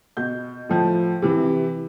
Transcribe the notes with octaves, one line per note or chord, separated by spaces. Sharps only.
B2 G6
A2 F3
C3 E3